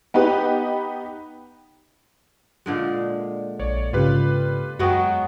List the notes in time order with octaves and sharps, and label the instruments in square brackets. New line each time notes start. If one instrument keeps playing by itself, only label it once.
[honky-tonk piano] B3 D#4 G4 B4
[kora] A#2 D3 G#3
[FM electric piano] A#1 [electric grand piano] C#5 D5
[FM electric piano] G#2 C#3 [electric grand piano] F4 G4 B4
[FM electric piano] F#2 C#6 D#6 [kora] F#3 G#3 B3 [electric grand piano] F#4 G5